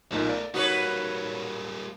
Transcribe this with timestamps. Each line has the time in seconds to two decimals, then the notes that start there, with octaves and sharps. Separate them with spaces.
0.12 B1 A#2 A3 D#4 A#4
0.29 D5
0.54 G3 A#3 D#4 F#4 B4 C#5